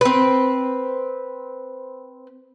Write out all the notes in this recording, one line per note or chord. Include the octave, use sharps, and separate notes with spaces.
C4 B4